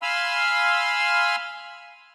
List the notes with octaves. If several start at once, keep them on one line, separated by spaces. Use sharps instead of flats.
F5 G#5 B5 C6 E6 F6